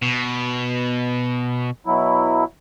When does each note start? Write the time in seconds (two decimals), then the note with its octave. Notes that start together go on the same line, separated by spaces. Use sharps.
0.02 B2
1.86 B2 F#3 E4